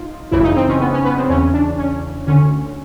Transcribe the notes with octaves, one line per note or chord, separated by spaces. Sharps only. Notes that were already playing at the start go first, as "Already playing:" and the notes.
Already playing: D#4 F4
G#1 F#2 C#3 E3 E4
D#4
C4
C#4
B3
C#4
B3
C4
E2 C#3 E3 C#4
D4
C#4
D2 D3 C#4